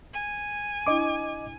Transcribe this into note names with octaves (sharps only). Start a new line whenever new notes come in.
G#5
D4 E4 D#5 D6